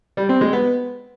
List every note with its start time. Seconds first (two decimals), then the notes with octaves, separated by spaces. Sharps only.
0.17 G3
0.29 C4
0.41 G#3
0.53 B3